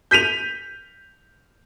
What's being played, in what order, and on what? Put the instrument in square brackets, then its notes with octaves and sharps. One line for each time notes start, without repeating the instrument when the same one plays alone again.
[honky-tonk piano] G6 B6 D#7 F7